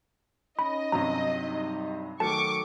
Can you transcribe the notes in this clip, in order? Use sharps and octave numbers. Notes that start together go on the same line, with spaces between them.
C#4 D#4 D#5 B5
G2 C3 F#3 A#5
G3 D#4
D#3 F#3 A3 A5 C#6 D6